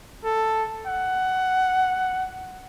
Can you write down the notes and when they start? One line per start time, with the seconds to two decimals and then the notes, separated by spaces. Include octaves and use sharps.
0.25 A4
0.87 F#5